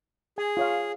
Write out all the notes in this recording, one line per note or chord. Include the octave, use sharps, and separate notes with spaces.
G#4 G#5
F4 C#5 F5